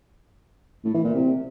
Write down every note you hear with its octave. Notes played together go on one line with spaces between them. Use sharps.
A2
E3
A#2
C3